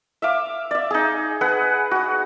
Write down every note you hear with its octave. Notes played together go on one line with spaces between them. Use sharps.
E5 F5 D6
D5 E5
D#4 G#4
G#4 B4 F#5
F#4 D#6